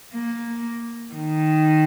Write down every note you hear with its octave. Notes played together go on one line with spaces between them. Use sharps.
A#3
D#3